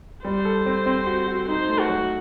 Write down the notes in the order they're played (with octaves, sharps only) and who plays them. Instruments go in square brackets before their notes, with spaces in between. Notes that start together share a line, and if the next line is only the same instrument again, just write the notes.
[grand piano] G3 [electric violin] C5
[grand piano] A4
C4
C4
F#4
F#4
[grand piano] D#4 [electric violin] C5
[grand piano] A3
[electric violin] F#4
[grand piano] F#3